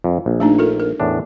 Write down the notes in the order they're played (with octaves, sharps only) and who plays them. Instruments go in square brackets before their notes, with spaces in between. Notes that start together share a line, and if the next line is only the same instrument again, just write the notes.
[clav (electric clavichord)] F2
A#1
[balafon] A3 D4 D#4
F4 A4 A#4
A#4
[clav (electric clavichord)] E2 A2 D4